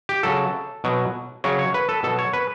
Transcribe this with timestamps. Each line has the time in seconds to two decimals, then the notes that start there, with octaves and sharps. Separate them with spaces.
0.09 G4
0.23 C#3 F#3 A4
0.84 B2 F#3
1.44 C#3 F#3 C#5
1.59 C#5
1.74 B4
1.89 A4
2.03 B2 F#3 A4
2.19 C#5
2.33 B4